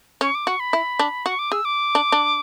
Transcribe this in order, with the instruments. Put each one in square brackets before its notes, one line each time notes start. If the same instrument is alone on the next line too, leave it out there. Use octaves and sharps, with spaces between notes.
[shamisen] C#4 [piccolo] C#6
[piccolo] D6
[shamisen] F#4 [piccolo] C#6
[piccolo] B5
[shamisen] E4
D4
[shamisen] F#4 [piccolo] C#6
[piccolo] D6
[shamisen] G#4 [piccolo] E6
[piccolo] D6
[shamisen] D4
D4